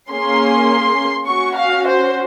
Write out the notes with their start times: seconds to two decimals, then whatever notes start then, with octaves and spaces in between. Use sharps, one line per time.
0.10 A#3 C#4 G#4 C6
1.27 C#4 F#4 C#6
1.56 F5
1.85 C5